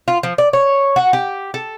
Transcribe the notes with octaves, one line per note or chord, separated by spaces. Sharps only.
F4
F3
D5
C#5
F#4
G4
A4